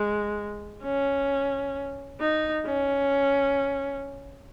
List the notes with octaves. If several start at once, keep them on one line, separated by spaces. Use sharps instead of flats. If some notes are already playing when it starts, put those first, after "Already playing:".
Already playing: G#3
C#4
D#4
C#4